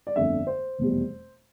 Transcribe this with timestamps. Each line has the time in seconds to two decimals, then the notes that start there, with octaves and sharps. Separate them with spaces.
0.07 D5
0.16 G1 F2 D3 A3 D4 E5
0.47 C5
0.79 F1 E2 B2 G3